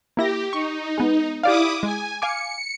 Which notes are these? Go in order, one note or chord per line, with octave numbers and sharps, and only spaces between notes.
A#3 E4 G4 A#6
D#4 C#6
G#3 B3
E4 G4 D5 F5 D6 D#6
G#3 G#5
F5 G#5 D6 C#7